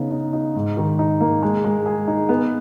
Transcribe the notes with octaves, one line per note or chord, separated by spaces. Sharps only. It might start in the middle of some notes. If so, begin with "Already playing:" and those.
Already playing: C#3 B3 D#4
D#4
D#4
G#2
D#3
D#4
A#3
G#3
G#3
G#4
D#4
B3